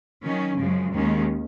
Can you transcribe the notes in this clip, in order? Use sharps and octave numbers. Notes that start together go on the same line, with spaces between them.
D#3 F#3 C#4
F#2 C#3 F3 G#3
D#2 D#3 G#3 C#4